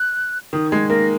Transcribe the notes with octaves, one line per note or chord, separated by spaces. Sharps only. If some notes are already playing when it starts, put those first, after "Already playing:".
Already playing: F#6
D#3 D#6
G#3 G#6
A#3 A#6